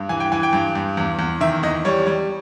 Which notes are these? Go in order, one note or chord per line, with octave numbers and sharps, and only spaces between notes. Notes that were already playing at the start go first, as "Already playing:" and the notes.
Already playing: G2
E3 G#5
G5
E3 G#5
G5
G2
G2
E2
E2
D#3 E5
E2 D#5
G3 C#5
G3